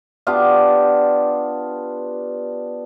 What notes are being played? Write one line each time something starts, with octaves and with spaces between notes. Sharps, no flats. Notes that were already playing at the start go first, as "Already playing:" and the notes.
B3 D4 F4 G4